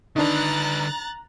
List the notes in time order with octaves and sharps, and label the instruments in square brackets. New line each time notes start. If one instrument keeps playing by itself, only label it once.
[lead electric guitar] D3 B4 [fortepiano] D#3 D4 [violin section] A#5 F#6 A6